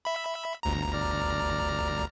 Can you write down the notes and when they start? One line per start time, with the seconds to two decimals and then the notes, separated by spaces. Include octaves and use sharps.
0.05 E5 B5
0.63 G1 D2 A#5
0.93 D5 F6